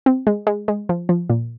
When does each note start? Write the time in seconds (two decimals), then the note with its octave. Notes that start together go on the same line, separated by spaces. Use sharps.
0.06 C4
0.27 G#3
0.47 G#3
0.68 G#3
0.89 F3
1.09 F3
1.30 A#2